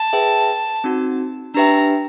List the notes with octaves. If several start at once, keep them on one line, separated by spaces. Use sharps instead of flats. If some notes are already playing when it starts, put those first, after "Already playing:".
Already playing: A5
G#4 B4 E5 G5
C4 D#4 F#4
D4 G4 B4 E5 G5 A#5